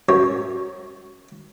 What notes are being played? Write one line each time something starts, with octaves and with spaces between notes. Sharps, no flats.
F#2 C#5